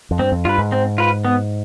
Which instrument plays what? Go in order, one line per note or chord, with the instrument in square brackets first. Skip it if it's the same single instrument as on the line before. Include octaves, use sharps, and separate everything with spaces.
[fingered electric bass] F2
[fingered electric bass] G2 [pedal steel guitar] C4
[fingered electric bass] F2
[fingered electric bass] G2 [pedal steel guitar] F4 B4
[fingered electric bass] G#2
[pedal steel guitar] C4
F4 B4
B3